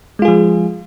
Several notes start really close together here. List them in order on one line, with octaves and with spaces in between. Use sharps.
G#3 F4 G#4 F3